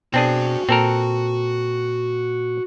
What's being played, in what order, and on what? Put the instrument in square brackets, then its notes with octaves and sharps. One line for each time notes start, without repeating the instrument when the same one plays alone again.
[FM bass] B2 [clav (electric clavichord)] C4 D4 G#4 [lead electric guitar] F#4 G#5
[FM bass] A#2 [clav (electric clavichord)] C4 A4 A#4